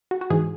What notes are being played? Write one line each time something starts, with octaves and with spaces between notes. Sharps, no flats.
F#4
F#4
G#2 E3 G#4